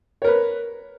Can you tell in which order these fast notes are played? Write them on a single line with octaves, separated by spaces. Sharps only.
C#5 A#4 B4